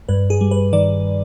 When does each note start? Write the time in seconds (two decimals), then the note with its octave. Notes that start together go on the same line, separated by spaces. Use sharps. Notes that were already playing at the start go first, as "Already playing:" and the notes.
0.09 G2 B4
0.30 G#4
0.41 G3
0.51 B4
0.73 D#3 D5